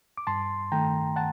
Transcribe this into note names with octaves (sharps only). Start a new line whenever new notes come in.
D6
G2 A5 C6
D#3 A3 G5 A#5
F#5 A5